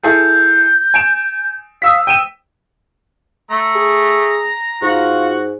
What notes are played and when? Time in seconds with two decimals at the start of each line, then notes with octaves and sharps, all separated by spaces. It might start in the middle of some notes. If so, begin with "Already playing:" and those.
0.03 E4 G#4 A4 G6
0.94 G#5 D7 E7
1.82 F5 D#6 E6 B6
2.07 G5 D#7 E7
3.50 A3 A#5
3.75 G#4
4.82 G#2 F4 F#4